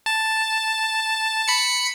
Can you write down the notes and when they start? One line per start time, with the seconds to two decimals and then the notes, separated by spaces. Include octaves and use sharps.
0.06 A5
1.48 B5 C#7